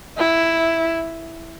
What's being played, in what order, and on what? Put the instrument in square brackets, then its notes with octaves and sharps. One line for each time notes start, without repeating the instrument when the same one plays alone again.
[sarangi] E4